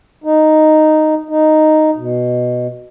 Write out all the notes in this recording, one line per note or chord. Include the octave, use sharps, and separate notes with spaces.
D#4
D#4
B2